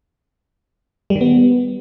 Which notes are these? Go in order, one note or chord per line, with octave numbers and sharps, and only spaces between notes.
G3
D#3
B3